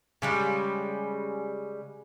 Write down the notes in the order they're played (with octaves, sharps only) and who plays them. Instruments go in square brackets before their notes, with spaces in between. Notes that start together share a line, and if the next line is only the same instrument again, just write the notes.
[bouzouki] C#3 G3 G#3